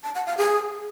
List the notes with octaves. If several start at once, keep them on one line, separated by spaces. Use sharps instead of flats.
A5
F#5
F5
G#4